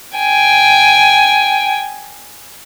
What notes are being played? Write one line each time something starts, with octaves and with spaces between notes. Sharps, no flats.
G5 G#5